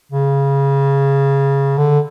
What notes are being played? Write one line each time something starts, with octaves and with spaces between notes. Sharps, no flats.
C#3
D3